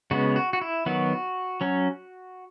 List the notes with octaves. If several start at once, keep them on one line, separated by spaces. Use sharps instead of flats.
C#3 G#3 B3 F#4
F#4
F#4
E4
D#3 F#3 B3 F#4
F#3 C#4